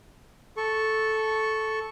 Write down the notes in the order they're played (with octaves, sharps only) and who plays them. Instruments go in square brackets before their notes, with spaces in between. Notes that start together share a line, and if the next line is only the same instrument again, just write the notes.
[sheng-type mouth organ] A4 C#6